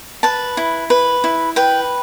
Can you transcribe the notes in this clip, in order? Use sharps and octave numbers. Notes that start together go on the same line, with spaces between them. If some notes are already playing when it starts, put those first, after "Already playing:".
B4 A5
E4
B4
E4
B4 G5